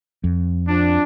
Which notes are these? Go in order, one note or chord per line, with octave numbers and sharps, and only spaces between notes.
F2
F3 C4 D4